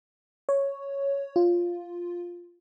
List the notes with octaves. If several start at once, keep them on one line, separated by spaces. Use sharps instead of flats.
C#5
F4